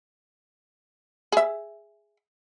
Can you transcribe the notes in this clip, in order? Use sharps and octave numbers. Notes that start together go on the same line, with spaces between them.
G#4 E5